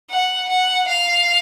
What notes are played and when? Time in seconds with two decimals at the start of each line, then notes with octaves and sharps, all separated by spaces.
0.10 F#5
0.49 F#5
0.88 F5